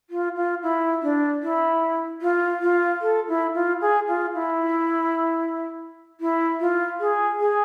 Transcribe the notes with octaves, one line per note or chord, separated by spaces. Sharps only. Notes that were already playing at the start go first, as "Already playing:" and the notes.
F4
F4
E4
D4
E4
F4
F4
A4
E4
F4
G#4
F4
E4
E4
F4
G#4
G#4